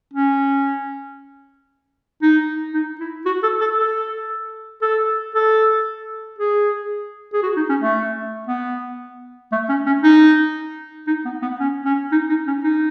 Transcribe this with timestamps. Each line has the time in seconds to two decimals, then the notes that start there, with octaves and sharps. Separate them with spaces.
0.14 C#4
2.22 D#4
2.74 D#4
3.00 E4
3.26 F#4
3.43 A4
3.61 A4
3.79 A4
4.82 A4
5.35 A4
6.39 G#4
7.33 G#4
7.43 F#4
7.57 D#4
7.69 C#4
7.82 A3
8.47 B3
9.52 A3
9.69 C#4
9.86 C#4
10.04 D#4
11.08 D#4
11.25 B3
11.42 B3
11.60 C#4
11.86 C#4
12.12 D#4
12.30 D#4
12.47 C#4
12.64 D#4